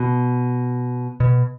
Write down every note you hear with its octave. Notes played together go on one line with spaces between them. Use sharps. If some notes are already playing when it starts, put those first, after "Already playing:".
Already playing: B2
B2